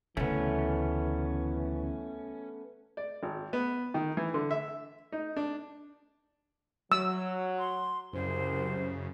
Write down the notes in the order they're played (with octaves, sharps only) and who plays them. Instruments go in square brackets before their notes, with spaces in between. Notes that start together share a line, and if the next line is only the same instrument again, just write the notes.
[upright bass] D2 C#3 [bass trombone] E3 [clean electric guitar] A3 B3 [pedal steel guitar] C#4
[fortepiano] D5
G#1
B3
D#3
E3
D3
E5
D#4
D4
[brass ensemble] F#3 [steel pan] E6
[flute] C6
[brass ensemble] C2 [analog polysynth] F#2 C#3 [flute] C5